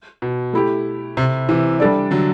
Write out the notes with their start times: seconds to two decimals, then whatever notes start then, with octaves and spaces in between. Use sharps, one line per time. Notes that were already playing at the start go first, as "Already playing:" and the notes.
0.22 B2
0.53 A3 E4 G4
1.17 C3
1.49 C3 E3
1.80 G3 D4 A4 D5
2.11 D3 F#3